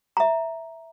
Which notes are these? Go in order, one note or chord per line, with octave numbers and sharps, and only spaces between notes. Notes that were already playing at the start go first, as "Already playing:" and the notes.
E5 A#5